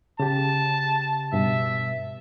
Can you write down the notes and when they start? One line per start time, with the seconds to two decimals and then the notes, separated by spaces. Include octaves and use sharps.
0.20 C#3 G4 A5
1.33 G2 B2 E5